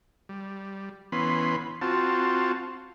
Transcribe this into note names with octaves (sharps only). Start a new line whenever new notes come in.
G3
E3 B3 C#4 B5 C6
C4 F4 F#4 A5